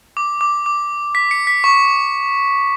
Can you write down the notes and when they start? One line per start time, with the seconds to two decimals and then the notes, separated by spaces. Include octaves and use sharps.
0.17 D6
0.41 D6
0.66 D6
1.15 B6
1.31 C#7
1.47 B6
1.64 C#6